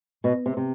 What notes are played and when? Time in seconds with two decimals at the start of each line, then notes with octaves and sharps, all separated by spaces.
0.24 B2
0.46 C3
0.57 C3